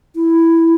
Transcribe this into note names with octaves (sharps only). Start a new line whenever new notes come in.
E4